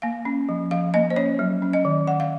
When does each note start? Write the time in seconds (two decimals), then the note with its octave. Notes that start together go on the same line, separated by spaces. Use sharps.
0.02 A#3 F5
0.25 C#4
0.49 F3
0.71 F3 F5
0.94 A#3 D#5
1.10 C5
1.16 C#4 C#5
1.39 F#3
1.62 C#4
1.73 D#5
1.85 D#3
2.07 D#3 F#5
2.20 F5